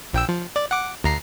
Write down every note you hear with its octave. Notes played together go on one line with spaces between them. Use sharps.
A#1 G5 E6
F3
D5
F#5 D6
D2 A#5 C7